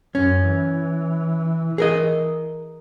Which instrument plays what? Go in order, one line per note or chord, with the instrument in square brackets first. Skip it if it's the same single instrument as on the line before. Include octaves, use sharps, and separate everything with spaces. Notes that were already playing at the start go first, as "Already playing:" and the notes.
[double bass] F#2 [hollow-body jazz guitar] C#4
[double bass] E3
[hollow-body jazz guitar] G#4 A#4 D#5